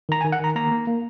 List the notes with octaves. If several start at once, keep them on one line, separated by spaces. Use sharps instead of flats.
D#3 A#5
G#5
D#3
F#5
D#3 A#5
A#3 A#5
A#3
A#3